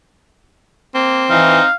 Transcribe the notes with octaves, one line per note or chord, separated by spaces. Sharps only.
A#3 C4
E3 D#4 F5